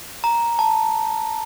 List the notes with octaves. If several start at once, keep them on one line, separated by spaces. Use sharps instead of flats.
A#5
A5